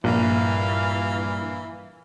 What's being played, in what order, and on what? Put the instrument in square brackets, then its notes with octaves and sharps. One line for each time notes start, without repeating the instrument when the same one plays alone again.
[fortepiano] A#1 [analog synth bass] G2 [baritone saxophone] E3 [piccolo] F5